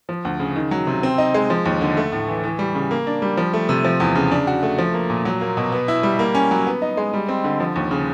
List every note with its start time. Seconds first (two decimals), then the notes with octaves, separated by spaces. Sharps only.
0.09 F3
0.25 D2
0.40 C#3
0.56 D#3
0.71 F#3
0.87 C3
1.03 C4
1.18 D#4
1.34 G#3
1.50 F3
1.66 D#2
1.81 D3
1.97 A3
2.12 A2
2.28 E3
2.44 E3
2.59 G3
2.75 C#3
2.91 A#3
3.07 D4
3.22 G3
3.37 F3
3.53 A3
3.69 C3
3.84 F3
4.00 E2
4.15 C#3
4.31 D4
4.47 F#4
4.63 A3
4.78 F3
4.94 A#3
5.10 A#2
5.25 F#3
5.41 A#3
5.57 B2
5.72 B3
5.88 E4
6.03 G3
6.19 A#3
6.35 C#4
6.51 F#3
6.67 B3
6.82 D#4
6.97 G#3
7.14 G3
7.29 C4
7.44 D3
7.60 F3
7.76 D#2
7.91 C#3